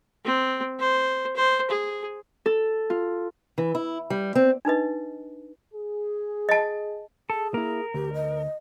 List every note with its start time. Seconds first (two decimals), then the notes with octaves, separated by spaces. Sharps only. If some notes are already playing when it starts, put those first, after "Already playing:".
0.25 C4
0.80 C5
1.36 C5
1.70 G#4
2.46 A4
2.90 F4
3.58 E3
3.75 E4
4.10 G3
4.35 C4
4.65 D4 D#4 B4 D#5
5.73 G#4
6.49 D#5 A5
7.30 G#4 A4
7.54 A#3 E4 A#4
7.94 D2 G4
8.14 D#5